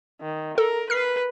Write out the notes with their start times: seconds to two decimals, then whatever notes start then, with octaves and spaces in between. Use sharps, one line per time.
0.21 D#3
0.58 A4 A#4
0.90 B4 F6 C7